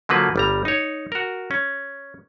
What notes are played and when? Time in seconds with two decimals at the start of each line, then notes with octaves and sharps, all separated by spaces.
0.09 D3 F3 F#3 A#3 B4
0.36 G1 G3 A#5
0.65 D#4 C#5
1.12 F#4 A#4
1.51 C#4